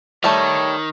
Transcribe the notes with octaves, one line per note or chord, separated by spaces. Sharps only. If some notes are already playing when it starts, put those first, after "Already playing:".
D#3 G3 A3 C#5